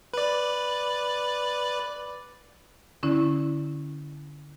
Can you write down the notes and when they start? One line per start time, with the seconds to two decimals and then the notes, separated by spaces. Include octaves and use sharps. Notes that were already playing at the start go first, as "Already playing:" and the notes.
0.14 B4 D5
3.03 D3 C#4 E4